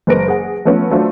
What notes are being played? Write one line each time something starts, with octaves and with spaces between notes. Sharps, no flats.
F#1 G#3 A#3 B4 A#6 D7
G#4 F#5
F3 A3 B3 C#4
F#3 A3 D4 F4 C5